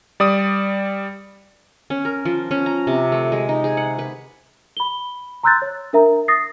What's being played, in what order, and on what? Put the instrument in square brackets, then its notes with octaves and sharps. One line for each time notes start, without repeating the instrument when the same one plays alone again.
[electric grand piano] G3 D5 D#6
[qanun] C#4
A#4
F3
C#4
A#5
C3
A3
G#3
D#4
G#4
F#5
B4
[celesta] B5 G7
A#5 C6 E6 F#6 G6 A6
C#5
D4 A#4 E5 A#5
D#6 A6 A#6 C7